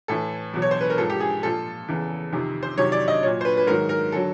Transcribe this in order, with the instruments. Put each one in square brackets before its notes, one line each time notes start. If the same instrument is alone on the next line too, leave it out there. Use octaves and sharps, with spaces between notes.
[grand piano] A2 E3 A4
E2 B2 F#3
C#5
C5
B4
A#4
G#2 F3 A4
G4
G#4
A#2 F3 A4
E2 C#3 E3
F2 C3 D#3
C5
F2 C3 D#3 F#3 C#5
D5
D#5
A#2 F#3 C#5
C5
B4
B4
G#2 D#3 F#3 A#4
A#4
D3 F#3 A4